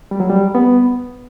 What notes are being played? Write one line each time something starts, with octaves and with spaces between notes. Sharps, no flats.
G3
F#3
G3
B3